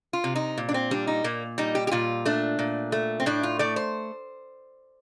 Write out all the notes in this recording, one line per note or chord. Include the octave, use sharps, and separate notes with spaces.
F4
C3
D#4
A#2
D4
C4
G3 D4
D#4
A#2 A#3
G3 D#4
G4
G4
A#2 F4
A3 D4
A#2
A3
C4
A2 D4
F4
A3 D5
C5